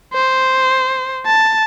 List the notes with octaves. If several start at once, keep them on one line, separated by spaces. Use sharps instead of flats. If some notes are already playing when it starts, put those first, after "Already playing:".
C5
A5